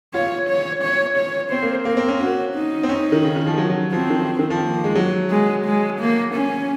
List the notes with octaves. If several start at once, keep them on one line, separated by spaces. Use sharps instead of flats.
F4 C#5
C#5
C#5
C#5
C4 C5
A#3
A#3 A#4
C4
C#4
C#4 F#4
D#4
C4
C#4
D#3
C#3
D#3
F3
F#3
F#3
F3 C4
D#3
D#3
F3
A#3
G#3
F#3
G#3
G#3
A#3
C#4